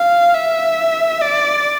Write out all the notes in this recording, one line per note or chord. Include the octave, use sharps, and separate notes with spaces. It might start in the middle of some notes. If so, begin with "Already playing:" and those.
Already playing: F5
E5
D5